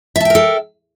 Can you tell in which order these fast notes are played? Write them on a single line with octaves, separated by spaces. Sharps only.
E5 A5 G5 A#4 A4